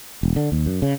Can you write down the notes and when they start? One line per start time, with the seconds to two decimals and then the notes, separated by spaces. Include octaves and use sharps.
0.23 E1
0.36 D3
0.52 D#2
0.66 F#2
0.82 C#3